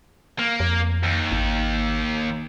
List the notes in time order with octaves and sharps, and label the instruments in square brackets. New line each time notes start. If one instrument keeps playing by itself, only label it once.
[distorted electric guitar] A#3
[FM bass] F2
[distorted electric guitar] D#2
[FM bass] G#1